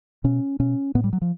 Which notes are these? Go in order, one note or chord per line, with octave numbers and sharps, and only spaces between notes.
B2 C#4
B2 C#4
A2 B3
G3
F#3
F3